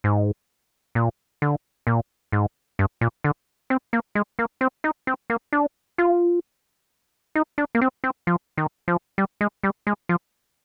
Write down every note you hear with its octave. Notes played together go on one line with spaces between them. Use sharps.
G#2
A#2
D3
A#2
G#2
G2
A#2
D3
C4
A#3
G#3
A#3
C4
D#4
C4
A#3
D4
F4
D#4
D4
A#3
C4
C4
F3
D#3
F3
G3
G#3
G3
G#3
F3